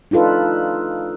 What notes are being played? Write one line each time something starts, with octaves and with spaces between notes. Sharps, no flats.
D4 D#4 F4 A4 B4